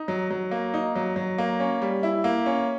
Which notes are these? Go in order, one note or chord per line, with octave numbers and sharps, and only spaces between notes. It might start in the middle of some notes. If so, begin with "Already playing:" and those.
Already playing: D#4
F#3
F#3
A#3
D#4
F#3
F#3
A#3
C#4
G3
E4
A#3
C#4